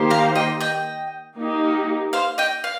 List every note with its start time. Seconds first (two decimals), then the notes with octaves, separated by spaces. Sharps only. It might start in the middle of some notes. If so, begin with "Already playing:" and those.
Already playing: D#3 A#3 G4 C5
0.10 F5 A#5
0.35 D#5 G5
0.60 D#5 G5
1.37 A#3 D#4 G4
2.13 C5 F5
2.38 D#5 G5
2.64 F5